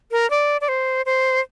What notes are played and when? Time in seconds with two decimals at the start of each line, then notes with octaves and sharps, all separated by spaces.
0.12 A#4
0.30 D5
0.61 D5
0.68 C5
1.06 C5